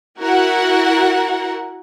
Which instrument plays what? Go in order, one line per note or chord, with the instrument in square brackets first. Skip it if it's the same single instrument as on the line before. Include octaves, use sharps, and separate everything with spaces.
[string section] E4 F#4 A#4 F#5